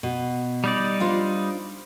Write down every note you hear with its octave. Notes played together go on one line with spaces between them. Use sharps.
B2
G3 D#4 D5
D4 F4 C5